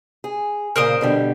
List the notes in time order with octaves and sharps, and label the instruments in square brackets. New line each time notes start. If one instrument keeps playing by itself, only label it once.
[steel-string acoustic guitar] G#4
[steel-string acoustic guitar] A#2 C#3 [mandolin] A#4 C5 D#6
[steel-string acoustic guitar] B2 D3 G3